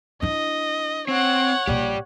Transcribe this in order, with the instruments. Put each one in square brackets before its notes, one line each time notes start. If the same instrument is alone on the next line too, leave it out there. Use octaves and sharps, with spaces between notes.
[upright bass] D4 E4 [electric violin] D#5
[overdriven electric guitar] C4 [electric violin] C#5 F#5
[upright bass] A#1 A#2 [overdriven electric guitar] G4 D5